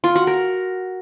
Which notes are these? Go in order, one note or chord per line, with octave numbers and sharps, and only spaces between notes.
F4
F#4
A#4